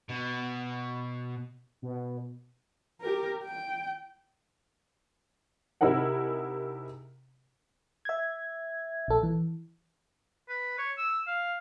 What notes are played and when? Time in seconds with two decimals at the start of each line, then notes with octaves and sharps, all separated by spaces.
0.09 B2
1.82 B2
3.01 G4 A#4
3.44 G5
5.81 C3 D#4 E4 G#4 A#4 F#5
8.05 E5 G#6
9.08 A#1 A4
9.23 E3
10.49 B4
10.78 C#5
10.97 E6
11.27 F5